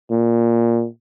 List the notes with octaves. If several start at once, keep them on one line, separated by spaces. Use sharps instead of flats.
A#2